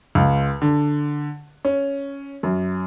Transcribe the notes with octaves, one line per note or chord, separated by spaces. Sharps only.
C#2
D3
C#4
F#2